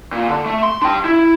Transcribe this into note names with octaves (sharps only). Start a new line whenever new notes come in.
A#2
D3
A3
C6
D4 G5
E4